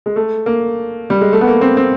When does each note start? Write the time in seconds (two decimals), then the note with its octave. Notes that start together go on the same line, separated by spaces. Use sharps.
0.06 G#3
0.16 A3
0.46 A#3
1.10 G3
1.21 G#3
1.33 A3
1.41 B3
1.48 A#3
1.61 C4
1.77 C4